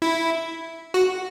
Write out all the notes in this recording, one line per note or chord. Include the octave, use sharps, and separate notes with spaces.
E4
F#4